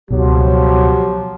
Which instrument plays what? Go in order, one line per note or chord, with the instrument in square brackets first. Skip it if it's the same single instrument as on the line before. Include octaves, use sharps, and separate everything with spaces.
[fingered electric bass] C#2 B2 [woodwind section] F3 G4 [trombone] F#3